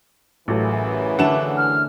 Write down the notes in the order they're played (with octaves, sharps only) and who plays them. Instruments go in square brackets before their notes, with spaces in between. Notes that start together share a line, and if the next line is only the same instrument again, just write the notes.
[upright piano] A1 F#3 A4 [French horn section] F#2 C#3 E3
[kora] D3 A3 D4 [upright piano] F#5 E7
[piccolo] F6